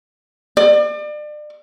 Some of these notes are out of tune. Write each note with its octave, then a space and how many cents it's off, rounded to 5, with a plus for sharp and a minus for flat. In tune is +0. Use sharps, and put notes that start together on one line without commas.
D5 +35